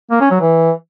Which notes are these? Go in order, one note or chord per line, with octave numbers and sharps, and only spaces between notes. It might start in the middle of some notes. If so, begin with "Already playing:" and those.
A#3
C#4
F#3
E3